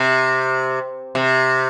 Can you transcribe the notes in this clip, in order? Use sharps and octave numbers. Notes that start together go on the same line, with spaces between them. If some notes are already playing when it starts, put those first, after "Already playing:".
Already playing: C3
C3